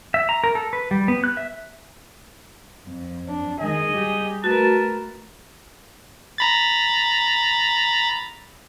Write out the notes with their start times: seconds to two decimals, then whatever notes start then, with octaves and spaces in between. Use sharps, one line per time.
0.14 E5
0.29 A#5
0.44 A#4
0.55 A4
0.73 B4
0.91 G3
1.08 B3
1.24 F#6
1.37 E5
2.87 F2
3.28 D4
3.60 D#3 G#3 G#4 D#5
3.92 G3 G4
4.44 A3 F#4 A#4 B4 A5
6.38 A#5 B5 A6